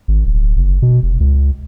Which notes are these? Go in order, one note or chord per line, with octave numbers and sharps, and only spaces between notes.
G#1
D1
F#1
B2
F1
C#2